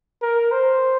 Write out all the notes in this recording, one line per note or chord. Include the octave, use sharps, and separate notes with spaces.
A#4
C5